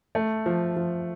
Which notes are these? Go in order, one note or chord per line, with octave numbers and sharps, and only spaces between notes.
A3
F3
F3